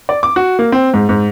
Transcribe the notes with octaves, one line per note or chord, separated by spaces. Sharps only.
D5
D6
F#4
A#3
C4
G#2
G#2